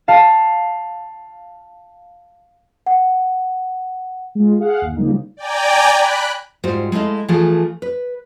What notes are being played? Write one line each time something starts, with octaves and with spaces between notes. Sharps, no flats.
F5 A5
F#5
G#3 F4
G#4 F5 F#5
G1 D#2
C#3 F3 G3 A#3 D#4
D5 G5 G#5 A#5
B5 F#6
G#2 G3 F4 F#4 C5
G#3 A3 E4 D#5 F5
E3 F3 A3 F4 G#4
B4